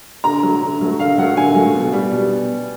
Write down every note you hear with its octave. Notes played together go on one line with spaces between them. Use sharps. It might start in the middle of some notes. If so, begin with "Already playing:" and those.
D3 A#5
F#3 A3
D3
F#3 A3
D3 F5
F#3 A3 F#5
D3 G#5
F#3 A3
B2
G3
B2